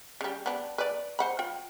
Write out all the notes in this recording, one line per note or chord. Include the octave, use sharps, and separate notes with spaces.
C#3 G3
B3 D4
B4 D5
C5 F#5 B5
F4 G5